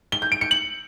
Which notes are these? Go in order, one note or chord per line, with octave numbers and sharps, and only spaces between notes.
G7
G6
D7
C#7
F#7